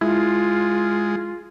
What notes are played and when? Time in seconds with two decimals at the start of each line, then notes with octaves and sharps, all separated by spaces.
0.01 G#3 E4 F4